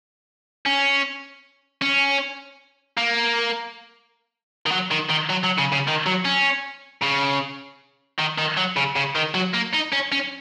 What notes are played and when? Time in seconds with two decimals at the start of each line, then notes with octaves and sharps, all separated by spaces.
0.66 C#4
1.82 C#4
2.98 A#3
4.66 D#3
4.71 F#3
4.91 D#3
5.09 D#3
5.29 F#3
5.43 F#3
5.58 C#3
5.72 C#3
5.87 D#3
6.06 F#3
6.25 C#4
7.03 C#3
8.19 D#3
8.38 D#3
8.57 F#3
8.77 C#3
8.96 C#3
9.16 D#3
9.35 F#3
9.54 A#3
9.73 D#4
9.92 C#4
10.12 C#4